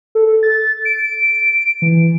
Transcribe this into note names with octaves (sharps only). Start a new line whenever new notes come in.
A4
A6
D7
E3